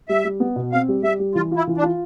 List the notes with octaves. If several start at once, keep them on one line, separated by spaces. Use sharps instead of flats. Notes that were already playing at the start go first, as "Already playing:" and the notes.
G3 E5
G3
B3
B2
C4 F5
G3
G3 E5
G3
E3 F4
F4
E4
E3
D4
F4